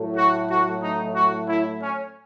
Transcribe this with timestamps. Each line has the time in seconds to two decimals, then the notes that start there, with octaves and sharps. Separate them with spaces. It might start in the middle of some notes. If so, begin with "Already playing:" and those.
Already playing: A2 F#3 A3
0.17 F#4
0.50 F#4
0.82 D#4
1.15 F#4
1.49 E4
1.82 C#4